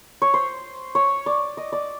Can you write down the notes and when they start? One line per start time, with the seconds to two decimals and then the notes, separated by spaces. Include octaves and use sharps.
0.22 C#5
0.34 C5
0.95 C#5
1.26 D5
1.57 D#5
1.72 D5